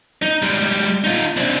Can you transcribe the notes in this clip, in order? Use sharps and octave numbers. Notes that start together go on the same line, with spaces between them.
D#4
G3 G#3
D#4 F4
C4 D4